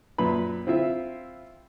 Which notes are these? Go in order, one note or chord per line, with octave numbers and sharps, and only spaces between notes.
F#2 A#2 B4 B5
C4 E4 F4 E5